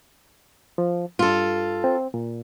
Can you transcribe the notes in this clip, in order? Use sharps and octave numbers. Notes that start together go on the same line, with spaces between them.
F3
G2 F4 A4
C4
A#2